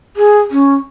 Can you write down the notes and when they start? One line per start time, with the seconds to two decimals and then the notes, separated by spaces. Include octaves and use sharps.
0.17 G#4
0.51 C#4